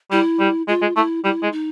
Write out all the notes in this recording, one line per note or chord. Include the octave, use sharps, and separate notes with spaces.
G3 E4
G3
G#3 F4
G#3
A3 E4
G3 E4
G#3
D#4